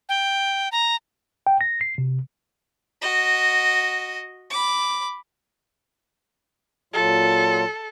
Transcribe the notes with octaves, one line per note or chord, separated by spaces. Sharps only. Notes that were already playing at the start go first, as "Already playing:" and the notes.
G5
A#5
G5
A#6
C7
C3
F#4 D#5
B5 D6
A#2 F#3 F4 A4